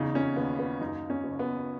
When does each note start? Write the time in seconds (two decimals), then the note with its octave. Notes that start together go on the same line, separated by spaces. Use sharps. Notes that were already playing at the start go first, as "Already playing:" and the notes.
Already playing: E2 C#3 D#4
0.15 C#4
0.36 D#2 B3
0.59 B3
0.81 F#2 D#4
1.10 C#4
1.24 F#1
1.39 B3